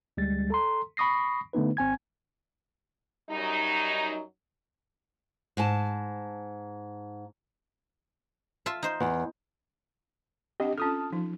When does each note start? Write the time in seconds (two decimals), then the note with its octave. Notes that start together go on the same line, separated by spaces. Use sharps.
0.17 D2 G3 G#3 A6
0.50 A4 A#5 C6
0.97 B5 C#6 D#6 A#6 C7
1.53 D3 A3 B3 D#4 B4
1.77 G#1 C4 G#5 G#6
3.30 F#2 F#3 G3 D#4
5.57 G#2 A5
8.66 F4 E5 A5
8.83 D#4 C5
9.00 E2
10.60 C4 D4 G4 D#5 F#5
10.78 C#4 F4 A4 A5 D#6 F6
11.13 F3 D#4